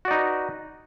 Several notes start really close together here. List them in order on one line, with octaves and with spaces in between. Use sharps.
F#4 D5 D#4 B4